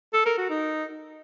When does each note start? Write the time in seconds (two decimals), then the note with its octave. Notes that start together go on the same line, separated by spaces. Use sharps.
0.13 A4
0.25 A#4
0.37 F#4
0.49 D#4